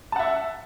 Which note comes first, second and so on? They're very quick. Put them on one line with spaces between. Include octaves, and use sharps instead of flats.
A5 F#5 E5